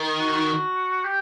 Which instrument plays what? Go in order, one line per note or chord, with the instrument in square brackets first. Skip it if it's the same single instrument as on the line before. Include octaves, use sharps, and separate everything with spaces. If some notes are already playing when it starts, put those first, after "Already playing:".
Already playing: [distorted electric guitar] D#3
[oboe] F#4
G4